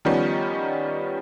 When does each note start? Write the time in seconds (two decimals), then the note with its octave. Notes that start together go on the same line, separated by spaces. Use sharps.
0.05 D#3 F3 G3 B3 C#4 D#4